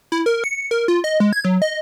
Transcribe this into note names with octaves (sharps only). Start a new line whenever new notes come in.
E4
A#4
C#7
A#4
F4
D#5
G#3
G#6
F#3
D#5